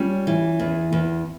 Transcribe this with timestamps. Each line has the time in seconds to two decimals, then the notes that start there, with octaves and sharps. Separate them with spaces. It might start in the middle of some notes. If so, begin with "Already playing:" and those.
Already playing: G3 C#4 F4
0.27 E3
0.60 E2
0.93 E2